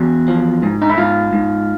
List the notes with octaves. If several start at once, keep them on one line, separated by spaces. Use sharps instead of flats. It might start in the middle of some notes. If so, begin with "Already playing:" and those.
Already playing: E2 F#4
F3
G#2
D#4
E4
G#2 F4
G#2